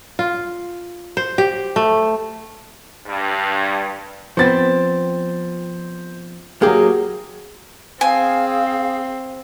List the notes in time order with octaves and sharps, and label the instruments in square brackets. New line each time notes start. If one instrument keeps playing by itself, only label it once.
[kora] F4
C5
G4
A3
[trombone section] G2
[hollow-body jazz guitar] F3 B3 C4 [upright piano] C5 A6
[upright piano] F#3 G#4 [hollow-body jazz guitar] A#3 G4
[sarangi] C4 [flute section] G#4 F5 [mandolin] G#5